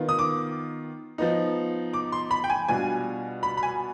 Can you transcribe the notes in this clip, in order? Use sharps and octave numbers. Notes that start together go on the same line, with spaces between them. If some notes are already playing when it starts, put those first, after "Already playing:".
Already playing: D#3 B3 F4
D#6
D6
F3 B3 D#4
D6
C6
B5
G5
G#5
B2 G3 D4 F4 G#5
B5
B5
G#5